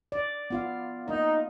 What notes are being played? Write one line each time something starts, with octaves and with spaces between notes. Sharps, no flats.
D5
B3 F4 F5
A#3 D#4 D#5